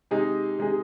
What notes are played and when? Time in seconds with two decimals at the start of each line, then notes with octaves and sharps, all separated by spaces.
0.11 C3 G#3 D#4 G#4
0.59 C3 G#3 D#4 G#4